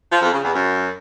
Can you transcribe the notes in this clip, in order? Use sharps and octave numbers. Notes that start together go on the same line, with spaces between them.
F3
F2
C#3
E2
F#2